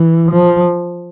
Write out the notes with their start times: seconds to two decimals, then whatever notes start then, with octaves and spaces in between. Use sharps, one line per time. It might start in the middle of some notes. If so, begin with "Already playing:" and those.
Already playing: E3
0.32 F3